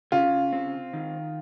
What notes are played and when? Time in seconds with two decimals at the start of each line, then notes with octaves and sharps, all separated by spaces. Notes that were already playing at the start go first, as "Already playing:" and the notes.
0.12 C#3 F4
0.53 C4
0.93 D#3